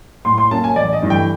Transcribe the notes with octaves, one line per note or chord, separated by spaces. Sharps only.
A2 C6
C6
F#3 A#3 C#4 A5
G#5
A1 D5
D#5
G2 E3 A3
G5